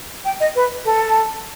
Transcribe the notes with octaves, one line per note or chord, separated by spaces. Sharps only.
G5
D#5
B4
A4